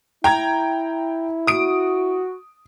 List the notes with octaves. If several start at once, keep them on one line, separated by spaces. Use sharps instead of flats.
E4 G5 A#5 G#6
F#4 D#6 D7